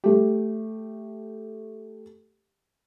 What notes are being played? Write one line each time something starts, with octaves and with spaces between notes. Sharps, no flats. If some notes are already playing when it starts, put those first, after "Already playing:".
A3 G4